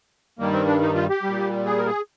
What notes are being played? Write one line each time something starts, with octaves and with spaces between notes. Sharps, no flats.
G2 D#3 G3 A#3
C4
D4
D#4
F4
G4
A#2 G3
G#4
A#4
G#4